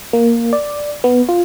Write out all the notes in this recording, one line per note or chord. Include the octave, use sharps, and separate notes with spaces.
A#3
D5
B3
F4